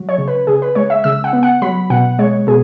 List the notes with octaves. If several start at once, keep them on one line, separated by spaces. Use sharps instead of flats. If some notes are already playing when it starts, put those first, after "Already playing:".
Already playing: F#3
C#5
C#3
B4
C#3 G#4
B4
G#3 C#5
E5
C#3 E6
F#5
B3
F#5
F#3 B5
B2 F#5
G#3 C#5
B2 G#4